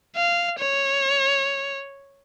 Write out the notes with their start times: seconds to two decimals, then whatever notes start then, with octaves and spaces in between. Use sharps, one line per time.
0.16 F5
0.59 C#5